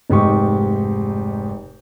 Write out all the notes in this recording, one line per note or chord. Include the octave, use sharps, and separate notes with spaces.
F1 G#2 D#4 G4 C#6